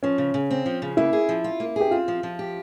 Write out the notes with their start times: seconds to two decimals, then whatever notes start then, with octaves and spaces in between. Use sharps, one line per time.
0.03 F3 C#4
0.18 C#3
0.34 C#3
0.50 C4
0.66 F3
0.82 C#3
0.97 A#3 E4
1.13 G#4
1.29 F3
1.44 F4
1.60 A#3
1.76 G4 G#4
1.91 C4 F4
2.08 F3
2.23 F3
2.39 G4